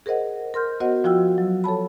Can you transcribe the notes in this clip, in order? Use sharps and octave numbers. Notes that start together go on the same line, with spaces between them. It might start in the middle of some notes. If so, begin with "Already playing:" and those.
G#4 A#4 C5 D#5 F#5
A#4 C6 F6 G6
B3 F#4 C5 D#5 F#5
F3 F4 F#4 G5 E6
F#3
A4 C#5 A5 B5